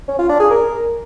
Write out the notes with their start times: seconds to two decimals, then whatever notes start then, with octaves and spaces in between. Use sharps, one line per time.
0.08 C#4
0.19 F4
0.29 D4
0.40 G#4
0.50 A#4